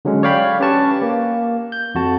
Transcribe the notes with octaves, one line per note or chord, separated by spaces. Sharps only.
D3 F#3 G#3 C#4
C#5 D5 F5 G5 B5
C#4 G4 B4 A5 C#6
A#3
G6
F2 F#4 A5